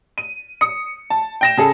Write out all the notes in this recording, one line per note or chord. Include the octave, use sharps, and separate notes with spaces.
D#7
D#6 C#7
A5
G5 A#6 E7
C#3 G#4 A4